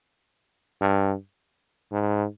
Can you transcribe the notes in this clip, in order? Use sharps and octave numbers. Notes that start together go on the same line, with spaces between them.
G2
G#2